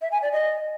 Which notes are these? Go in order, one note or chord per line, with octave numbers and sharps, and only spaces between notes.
E5
G#5
D5
D#5